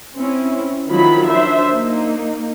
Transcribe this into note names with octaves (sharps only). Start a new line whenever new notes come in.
C4 C#4 E4
D#3 F3 F#3 E4 F4 B5
D4 C5 E5
A#3 D#4